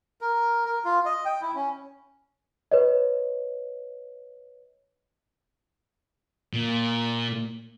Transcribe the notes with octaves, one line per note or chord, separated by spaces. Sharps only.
A#4
A#4
F4
D#5
G5
E4
C#4
B4 C#5 D#5
A#2